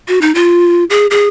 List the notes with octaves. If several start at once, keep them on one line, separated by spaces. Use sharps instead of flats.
F#4
D#4
F4
G#4
G#4